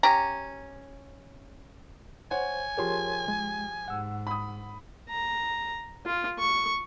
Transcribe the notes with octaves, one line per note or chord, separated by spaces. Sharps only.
C#4 G4 A#5
C5 C#5 F#5 G#5
F3 G4 G#4 A#4 C#5 C6
G#3
G#2 F#5 E6
B5 D#6
A#5
F4
C#6